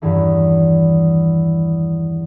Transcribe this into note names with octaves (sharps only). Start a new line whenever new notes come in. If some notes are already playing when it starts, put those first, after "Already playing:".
E2 G2 D#3 E3